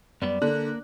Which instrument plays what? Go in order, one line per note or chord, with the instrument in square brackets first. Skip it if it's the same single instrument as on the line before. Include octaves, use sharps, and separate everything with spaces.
[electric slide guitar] F#2 G3 B3 [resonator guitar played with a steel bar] D5
[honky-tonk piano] D3 [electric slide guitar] A#3 [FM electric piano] D4 F#6